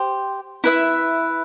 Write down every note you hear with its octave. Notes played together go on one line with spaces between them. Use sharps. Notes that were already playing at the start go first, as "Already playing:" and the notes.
Already playing: G4 C5
E4 B4 E5